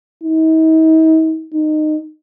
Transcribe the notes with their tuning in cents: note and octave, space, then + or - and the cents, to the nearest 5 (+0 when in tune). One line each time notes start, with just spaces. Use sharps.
D#4 +45
D#4 -20